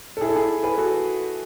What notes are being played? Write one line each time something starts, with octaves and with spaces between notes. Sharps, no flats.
A4
E4 G#4
A4
E4 G#4
G#4 B4
F#4 A4